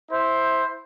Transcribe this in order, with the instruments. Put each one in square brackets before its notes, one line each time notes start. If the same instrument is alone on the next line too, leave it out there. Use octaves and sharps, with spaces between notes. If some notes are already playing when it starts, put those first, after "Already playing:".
[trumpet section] E4 C5